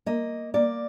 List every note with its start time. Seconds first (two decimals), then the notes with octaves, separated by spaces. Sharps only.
0.06 A#3 D#5
0.54 A#3 D5